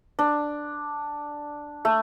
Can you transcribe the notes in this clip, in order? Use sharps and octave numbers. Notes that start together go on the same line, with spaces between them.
D4
A3